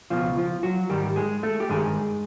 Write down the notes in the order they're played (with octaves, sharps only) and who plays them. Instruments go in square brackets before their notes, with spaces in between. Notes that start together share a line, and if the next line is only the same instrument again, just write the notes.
[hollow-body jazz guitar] C#2 B2 F3 F4
F3 F4
F#3 F#4
G#2 D#3 G3 G4
G#3 G#4
A3 A4
G4
G2 D#3 G#3 G#4